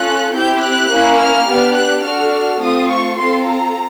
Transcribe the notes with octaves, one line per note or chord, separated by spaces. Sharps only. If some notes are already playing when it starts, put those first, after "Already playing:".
Already playing: C#4 F4 A4 F#6
C4 E4 G4 G6
F#6
A#3 C#4 E4
F6
B3 D4 G4
F#6
D4 F#4 A4 F6
A3 C4 F4 D#6
C#6
C4 F4 A4 C6
A#5